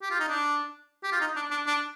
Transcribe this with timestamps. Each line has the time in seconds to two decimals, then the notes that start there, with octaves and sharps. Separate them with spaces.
0.02 G4
0.11 F4
0.20 D#4
0.29 D4
1.04 G4
1.12 F4
1.21 D#4
1.36 D4
1.51 D4
1.67 D4